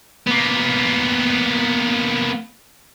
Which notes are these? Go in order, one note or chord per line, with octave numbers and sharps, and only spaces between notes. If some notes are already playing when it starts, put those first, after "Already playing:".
A#3 B3